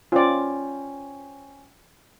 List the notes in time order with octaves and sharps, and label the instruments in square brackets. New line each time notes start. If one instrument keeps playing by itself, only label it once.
[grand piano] C#4 C5 G5 [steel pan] F4 D5